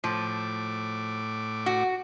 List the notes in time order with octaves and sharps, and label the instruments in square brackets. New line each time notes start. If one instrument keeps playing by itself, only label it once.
[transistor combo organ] A2 D6 [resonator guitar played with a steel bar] F3
[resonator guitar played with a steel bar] F#4